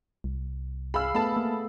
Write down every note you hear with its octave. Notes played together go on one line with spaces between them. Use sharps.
C2
G#4 F5 B5 E6
A3 B3 A4 A5 B5
A#3